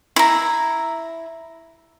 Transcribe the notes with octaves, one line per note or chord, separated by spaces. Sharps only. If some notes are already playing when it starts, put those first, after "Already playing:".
E4 A#5